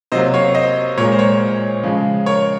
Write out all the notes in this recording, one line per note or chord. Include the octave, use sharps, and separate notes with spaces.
C3 F#3 A#3 C5 D#5
C#5 F5
C5 D#5
A#2 G#3 A#4 C#5
C5
A#4 C#5
C#3 F3 G#3
A#4 C#5